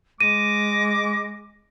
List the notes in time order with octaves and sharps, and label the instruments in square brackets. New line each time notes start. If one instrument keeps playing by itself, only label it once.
[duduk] G#3 [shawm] D6 [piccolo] A#6 [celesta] D#7